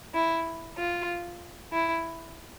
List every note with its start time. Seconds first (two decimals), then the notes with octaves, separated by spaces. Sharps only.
0.14 E4
0.78 F4
1.73 E4